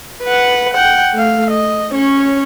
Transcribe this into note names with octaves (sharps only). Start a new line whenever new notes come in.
B4 F#5
F#5 G5
A3 F5
D#5
C#4 C#5